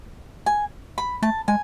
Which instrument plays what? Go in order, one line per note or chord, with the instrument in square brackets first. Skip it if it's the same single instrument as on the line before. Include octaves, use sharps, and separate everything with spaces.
[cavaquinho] G#5
B5
[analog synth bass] A3 [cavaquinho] A5
[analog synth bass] G#3 [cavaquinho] G#5